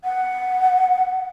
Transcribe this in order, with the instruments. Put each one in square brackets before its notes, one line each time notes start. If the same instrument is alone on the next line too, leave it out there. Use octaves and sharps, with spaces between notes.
[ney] F#5